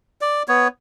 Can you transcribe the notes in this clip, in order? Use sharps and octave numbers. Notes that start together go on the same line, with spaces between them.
D5
B3 C#5